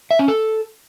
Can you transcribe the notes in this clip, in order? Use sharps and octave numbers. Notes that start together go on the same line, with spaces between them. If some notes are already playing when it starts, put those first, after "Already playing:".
E5
C#4
A4